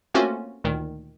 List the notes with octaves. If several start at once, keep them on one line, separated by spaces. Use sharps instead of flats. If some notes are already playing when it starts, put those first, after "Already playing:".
A3 A#3 C4 C#4 F4 F#4
D2 A#2 D#3